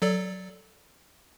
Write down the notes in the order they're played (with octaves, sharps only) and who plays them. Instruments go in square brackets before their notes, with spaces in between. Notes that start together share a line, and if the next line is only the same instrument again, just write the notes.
[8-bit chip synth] F#3 A4 D5